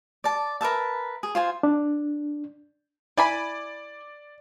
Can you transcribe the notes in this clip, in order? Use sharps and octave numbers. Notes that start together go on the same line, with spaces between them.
D5 A5
A#4 B4 E5 A5
G#4
F4 C5 G#5
D4
E4 D5 G#5 B5 D6